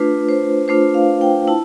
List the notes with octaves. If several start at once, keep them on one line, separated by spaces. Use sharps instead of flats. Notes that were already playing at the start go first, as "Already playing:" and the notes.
Already playing: A3 D4 F4 B4
C5
A3 D4 F4 C5
F5
G5
E4 A5